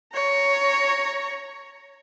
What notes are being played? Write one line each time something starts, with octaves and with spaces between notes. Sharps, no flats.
C#5 A#5